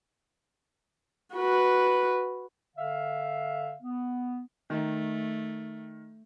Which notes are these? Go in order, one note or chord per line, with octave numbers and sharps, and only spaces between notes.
F#4 B4
D3 E5 F5
B3
D#3 A3